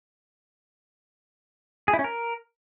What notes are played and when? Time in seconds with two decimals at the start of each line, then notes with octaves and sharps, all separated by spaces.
1.88 G#4
1.93 E4
1.99 C#4
2.04 A#4